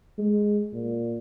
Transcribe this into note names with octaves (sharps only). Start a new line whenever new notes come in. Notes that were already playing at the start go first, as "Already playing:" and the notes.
G#3
A#2